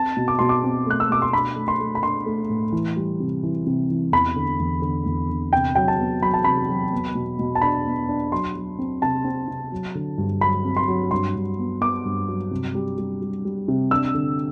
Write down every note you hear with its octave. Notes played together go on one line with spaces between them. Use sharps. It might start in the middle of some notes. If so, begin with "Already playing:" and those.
Already playing: C4 A5
B2
D6
B2 C6
D6
C4
A3 F#6
E6
B2 D6
C6
D4 B5
A3
C6
A3
B5
D4 C6
A3
A2
E3
G3
C3
E3
C3
E3
E2 B5
D3
E2
D3
E2
D3
C3 G5
F#3 G5
A5
B3
F#3 B5
A5
C3 B5
F#3
B3
B2
B2
A5
D4 B5
B3
D4
F#3 C6
F#3
C4
C3 A5
C4
C3
F#3
D3
G2
F#3 B5
C4
C6
F#3
G2 C6
G2
B3
B3 D6
G2
F#3
C3
G3
G3
G3
G3
C3
D4 E6
D3